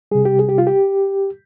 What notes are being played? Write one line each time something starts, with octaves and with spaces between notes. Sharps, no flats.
C3 G3 G#4
G4
G#4
G4
F4
G4